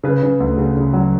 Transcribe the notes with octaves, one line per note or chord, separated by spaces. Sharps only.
C#3 B4
C#3
D2
C#3
C#3
F#3